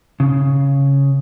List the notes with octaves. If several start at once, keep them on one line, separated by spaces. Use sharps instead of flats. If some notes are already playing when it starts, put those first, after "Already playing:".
C#3